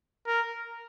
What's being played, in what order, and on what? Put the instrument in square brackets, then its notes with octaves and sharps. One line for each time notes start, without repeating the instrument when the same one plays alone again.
[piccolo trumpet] A#4